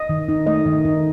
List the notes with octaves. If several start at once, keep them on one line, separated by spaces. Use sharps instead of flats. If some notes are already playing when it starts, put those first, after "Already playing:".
Already playing: D#5
D#3
D#4
A3 D#5
D#3
D#4